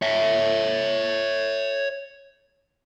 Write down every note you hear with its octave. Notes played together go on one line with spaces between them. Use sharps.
C#5 E5